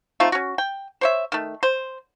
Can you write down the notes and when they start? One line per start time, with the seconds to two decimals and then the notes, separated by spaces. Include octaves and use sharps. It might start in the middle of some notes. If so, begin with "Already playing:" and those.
0.20 A3 C4 D#4 F4
0.32 C#4 F#4
0.58 G5
1.01 C5 C#5 E5
1.32 D#3 A3
1.63 C5